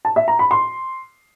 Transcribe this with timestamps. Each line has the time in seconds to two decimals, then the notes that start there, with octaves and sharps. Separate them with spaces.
0.05 A5
0.16 E5
0.28 A#5
0.39 B5
0.51 C6